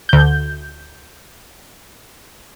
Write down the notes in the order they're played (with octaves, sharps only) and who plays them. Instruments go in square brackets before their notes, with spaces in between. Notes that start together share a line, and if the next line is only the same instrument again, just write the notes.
[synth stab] D2 G6